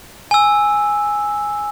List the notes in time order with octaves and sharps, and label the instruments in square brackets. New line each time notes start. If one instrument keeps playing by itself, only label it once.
[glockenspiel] G#5 E6